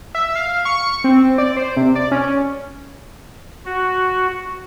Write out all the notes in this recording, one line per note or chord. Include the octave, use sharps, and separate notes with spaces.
E5
F5
C#6
C4
D5
C5
C3
D5
C#4
F#4